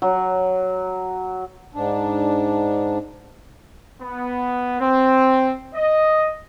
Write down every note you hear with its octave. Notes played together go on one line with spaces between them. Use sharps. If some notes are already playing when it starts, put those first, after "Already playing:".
F#3
G#2 D4
B3
C4
D#5